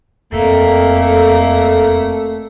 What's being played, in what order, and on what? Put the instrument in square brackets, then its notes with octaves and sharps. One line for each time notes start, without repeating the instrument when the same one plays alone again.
[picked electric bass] E1 [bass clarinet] F2 [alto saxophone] A3 [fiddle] A#3